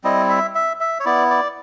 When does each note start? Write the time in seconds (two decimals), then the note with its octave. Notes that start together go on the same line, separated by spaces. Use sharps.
0.04 G3 C4 E4 D#5
0.29 E5
0.55 E5
0.80 E5
1.00 C#5
1.05 B3 E4 D5
1.30 D5